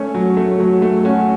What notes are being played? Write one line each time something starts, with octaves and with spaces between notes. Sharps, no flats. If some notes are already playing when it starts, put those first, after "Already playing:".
Already playing: A3 C#4
F#3
A3
F#3
A3
C#4 F#4